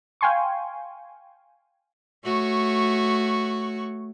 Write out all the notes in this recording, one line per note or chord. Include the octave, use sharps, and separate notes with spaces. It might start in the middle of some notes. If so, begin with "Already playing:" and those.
F5 G5 G#5 C6 C#6
A3 F#4 C#5